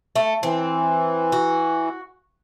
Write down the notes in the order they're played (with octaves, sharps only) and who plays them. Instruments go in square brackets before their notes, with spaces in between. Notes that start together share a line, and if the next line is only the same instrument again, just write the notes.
[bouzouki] A3
[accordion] E3 [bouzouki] C4
[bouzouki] F#4